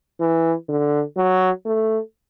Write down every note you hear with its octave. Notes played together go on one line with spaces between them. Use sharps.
E3
D3
F#3
A3